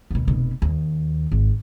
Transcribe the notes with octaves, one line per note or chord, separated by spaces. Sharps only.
D#2 B2
F1 B2
D#2
G#1